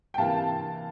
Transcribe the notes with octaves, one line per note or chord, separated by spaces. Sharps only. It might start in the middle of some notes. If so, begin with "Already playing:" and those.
G5
C3 E3 A#3 F5 A5